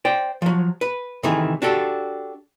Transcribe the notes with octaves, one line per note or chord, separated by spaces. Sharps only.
C5 D5 G5
F3 F#3
B4
C3 D#3 E3 A3 G#4
D4 F#4 G4 A4